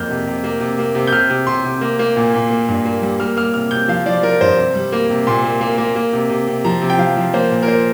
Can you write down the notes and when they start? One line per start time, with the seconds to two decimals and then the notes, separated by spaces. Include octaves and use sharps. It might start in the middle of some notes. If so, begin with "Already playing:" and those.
Already playing: F2 A#3 F6 G6
0.10 C3
0.27 C3
0.44 A#3
0.61 C3
0.79 A#3
0.95 C3
1.07 G6
1.12 C3 F6
1.30 C3
1.47 C3 C6
1.65 C3
1.81 A#3
1.99 A#3
2.16 A#2
2.34 A#2
2.51 A#3
2.68 G2
2.85 A#3
3.02 G3
3.20 A#3 F6
3.36 A#3 F6
3.54 C3 F6
3.71 C3 G6
3.88 F3 F5
4.06 F3 D5
4.23 F3 A#4
4.41 G2 C5
4.57 C3
4.75 G3
4.92 A#3
5.10 C3
5.27 A#2 C6
5.44 A#3
5.61 A#3
5.78 A#3
5.96 A#3
6.13 C3
6.30 C3
6.48 C3
6.65 F3 A#5
6.82 C3
6.90 G5
6.98 F3 F5
7.16 F3
7.34 A#3 C5
7.50 A#2
7.63 A#4
7.68 A#3 C5